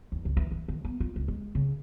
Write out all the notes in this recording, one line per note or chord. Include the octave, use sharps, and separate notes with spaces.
E2
C#2
E3
E3
D#3
B3
F4
C#2
G#3
C#3